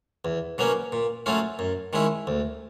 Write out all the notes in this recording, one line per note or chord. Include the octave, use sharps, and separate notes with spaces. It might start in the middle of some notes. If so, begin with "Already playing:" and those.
E2
B2 F#3 A#3 C#4
A#2
F#3 A3 C#4 F4
F#2
D#3 G#3 C#4 E4
D2